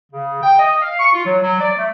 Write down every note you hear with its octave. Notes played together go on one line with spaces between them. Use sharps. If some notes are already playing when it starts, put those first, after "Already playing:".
C#3
G5
D#5
F5
C#6
F4
F#3
F#3
D5
A3